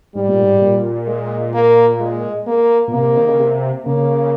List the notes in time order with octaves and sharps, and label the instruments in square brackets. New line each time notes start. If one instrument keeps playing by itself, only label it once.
[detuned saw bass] G#2 [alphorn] G3
[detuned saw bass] A#2
G#2
A#2
[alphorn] G#3
A#3
G#3
A#3
[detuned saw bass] A#2
[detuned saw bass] C3 [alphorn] A#3
[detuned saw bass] D#3
C#3
C3
[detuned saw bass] C#3 [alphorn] A#3